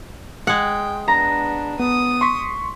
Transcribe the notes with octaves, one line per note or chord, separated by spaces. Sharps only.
G#3 F#5 G5
B3 D4 A#5
B3 D#6
C6 C#6 B6